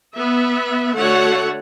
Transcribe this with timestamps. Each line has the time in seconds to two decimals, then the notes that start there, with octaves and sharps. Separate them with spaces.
0.15 B3 E5
0.96 D3 A3 F#4 C#5 F#5